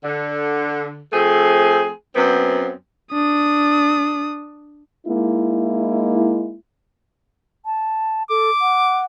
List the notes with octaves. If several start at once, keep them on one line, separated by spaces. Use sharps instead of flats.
D3
F3 A3 C4 G#4
F#2 B3 C4
D4 D#6
G#3 A#3 D#4 E4
A5
A4 D6
F#5